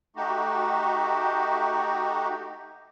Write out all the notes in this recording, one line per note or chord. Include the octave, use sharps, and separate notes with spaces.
A3 D#4 F#4 G4